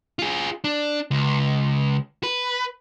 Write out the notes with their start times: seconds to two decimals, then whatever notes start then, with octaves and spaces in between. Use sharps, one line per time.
0.19 F4 G#4
0.64 D4
1.11 C#2
2.23 B4